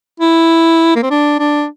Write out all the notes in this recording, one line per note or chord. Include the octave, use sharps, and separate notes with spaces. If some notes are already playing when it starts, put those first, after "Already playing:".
E4
A#3
C4
D4
D4